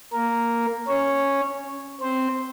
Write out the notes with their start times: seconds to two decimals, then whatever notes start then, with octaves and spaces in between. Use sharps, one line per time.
0.13 A#3 A#4
0.88 C#4 C#5
2.01 C4 C5